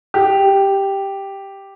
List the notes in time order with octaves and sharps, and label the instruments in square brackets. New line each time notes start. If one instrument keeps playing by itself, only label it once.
[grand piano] G4